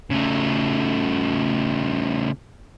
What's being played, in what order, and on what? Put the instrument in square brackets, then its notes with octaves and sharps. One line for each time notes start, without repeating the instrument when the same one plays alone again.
[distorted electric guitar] C#3 A3